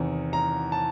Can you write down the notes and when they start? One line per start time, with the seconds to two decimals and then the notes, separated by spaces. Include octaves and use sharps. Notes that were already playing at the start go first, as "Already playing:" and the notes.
Already playing: E2 C3 D#3
0.33 A#5
0.72 A5